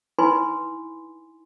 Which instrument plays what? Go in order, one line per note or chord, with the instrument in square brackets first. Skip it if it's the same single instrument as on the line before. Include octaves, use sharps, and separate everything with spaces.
[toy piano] D#4 E4 B4 G#5 B5 C6